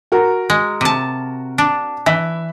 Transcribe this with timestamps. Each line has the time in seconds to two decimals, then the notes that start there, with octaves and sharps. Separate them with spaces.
0.12 F#4 A#4
0.50 G#3
0.81 C3 A5
1.58 D4
2.06 E3 E5 B6